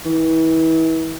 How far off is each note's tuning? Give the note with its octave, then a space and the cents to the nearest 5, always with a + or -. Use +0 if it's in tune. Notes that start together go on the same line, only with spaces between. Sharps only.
E3 -35